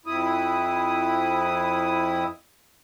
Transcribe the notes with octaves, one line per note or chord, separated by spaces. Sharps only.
F2 E4 D#6